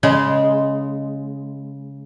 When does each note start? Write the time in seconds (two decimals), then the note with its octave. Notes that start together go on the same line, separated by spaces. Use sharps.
0.03 C#3 G#3